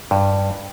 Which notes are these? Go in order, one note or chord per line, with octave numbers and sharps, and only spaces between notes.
G2